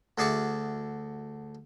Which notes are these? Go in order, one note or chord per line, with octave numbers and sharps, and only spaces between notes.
D2 F#4 G#4 D5 E5 C#6